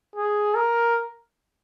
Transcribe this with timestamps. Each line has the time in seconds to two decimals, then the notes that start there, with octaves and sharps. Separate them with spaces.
0.16 G#4
0.55 A#4